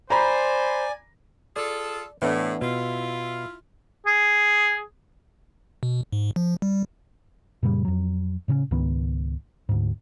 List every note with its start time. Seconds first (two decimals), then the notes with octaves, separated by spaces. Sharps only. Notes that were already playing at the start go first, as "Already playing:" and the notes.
0.10 C5 D5 G#5 A#5 B5
1.56 F4 G#4 A4 D5
2.22 A2 E3 B3 D4
2.62 B2 E4 F4
4.06 G#4
5.83 B2
6.13 G#2
6.36 F3
6.62 G3
7.63 F#2 A#2 C#3 G3
7.85 F2 F#3
8.48 A2 C#3 B3 C#4
8.71 C#2 G#2 D#3 B3
9.69 D2 G#2